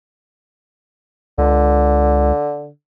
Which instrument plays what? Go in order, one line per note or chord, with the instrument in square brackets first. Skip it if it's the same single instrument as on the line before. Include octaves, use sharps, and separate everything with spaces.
[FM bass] C#2 [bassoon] D3